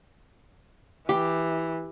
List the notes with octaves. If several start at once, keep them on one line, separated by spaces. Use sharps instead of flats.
E3 G4